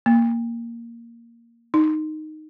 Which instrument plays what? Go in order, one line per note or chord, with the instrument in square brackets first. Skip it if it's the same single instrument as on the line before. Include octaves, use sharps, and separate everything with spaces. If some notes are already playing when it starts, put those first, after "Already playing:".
[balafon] A#3
D#4